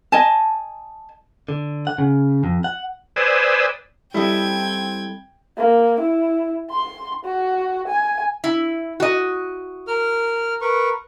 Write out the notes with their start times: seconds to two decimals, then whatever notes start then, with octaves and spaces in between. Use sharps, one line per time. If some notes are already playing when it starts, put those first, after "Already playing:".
0.12 D#5 G#5 A5
1.49 D3
1.87 F#5
1.98 C#3
2.44 F2
2.64 F#5
3.16 B4 C5 D5 G#5 D#6 E6
4.14 G3 C4 E4 A4 D#5 G5 G#6
5.58 A#3
6.00 E4
6.71 C6
7.25 F#4
7.88 G#5
8.44 E4
9.00 F#4 D#5
9.87 A#4 F6
10.61 A#4 B4 C#6